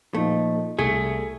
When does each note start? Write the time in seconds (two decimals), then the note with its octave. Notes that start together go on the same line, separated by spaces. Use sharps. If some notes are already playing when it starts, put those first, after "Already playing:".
0.15 A#2 F3 A3 D#4
0.79 C2 A3 G#4